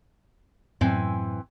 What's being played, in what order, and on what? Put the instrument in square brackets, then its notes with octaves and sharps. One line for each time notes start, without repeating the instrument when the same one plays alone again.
[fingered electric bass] F#2 A2 F#3 [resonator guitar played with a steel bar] E3 C4 G#5